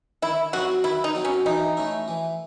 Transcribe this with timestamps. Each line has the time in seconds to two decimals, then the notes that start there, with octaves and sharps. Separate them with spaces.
0.22 D#3 E4
0.53 F#3 C4 D#4 F#4
0.84 D#3 E4
1.04 D#4
1.15 F#3 C4 D#4
1.25 C#4
1.46 E3 D#4
1.77 A3 C#4 E4
2.08 E3